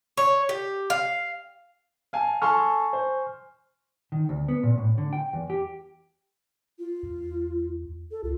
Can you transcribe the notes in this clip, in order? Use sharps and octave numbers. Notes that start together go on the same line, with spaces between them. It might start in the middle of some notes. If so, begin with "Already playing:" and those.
C#5
G4
F5
F5 G#5 A5
A4 G#5 A5 C6 C#6 F6
C5
D#3
D2
B3
A#2
A2
D3
G5
E2
G4
F4
E2
A4
C#2 F4